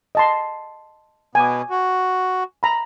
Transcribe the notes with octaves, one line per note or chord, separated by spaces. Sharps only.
D#5 A5 C6
B2 B3 G#5 D6
F#4
A#5 B5